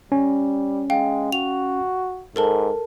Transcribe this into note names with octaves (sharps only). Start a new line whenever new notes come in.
G3 C#4
G#3 F5 G5
F#4 F7
G#2 A4 A#4 A5